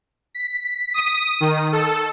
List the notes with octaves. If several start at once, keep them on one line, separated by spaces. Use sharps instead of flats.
B6
D#6
D#3
A4